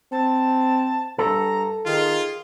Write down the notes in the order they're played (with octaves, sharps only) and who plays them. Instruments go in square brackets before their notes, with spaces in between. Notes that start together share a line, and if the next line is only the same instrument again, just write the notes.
[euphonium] C4 [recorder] A5
[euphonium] G2 [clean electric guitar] A4 [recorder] A#5
[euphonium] D#3 [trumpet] F4 [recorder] G#4